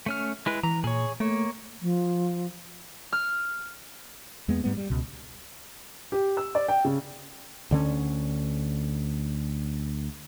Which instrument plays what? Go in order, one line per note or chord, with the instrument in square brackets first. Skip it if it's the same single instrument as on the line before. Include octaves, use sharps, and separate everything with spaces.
[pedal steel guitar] A3 C#4 F6
G#3 E4 B4
[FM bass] E3 [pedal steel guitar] A#5
[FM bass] A#2 [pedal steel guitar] G#4 C#5
[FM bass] A3 [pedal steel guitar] A#3 C#5
[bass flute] F3
[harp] F6
[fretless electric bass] E2 G#3 A#3 B3
G#2 G3 A3 B3
G3
C#2 B2
[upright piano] G4
E6
D5
G5
C#3
[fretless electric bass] D2 D3 C#4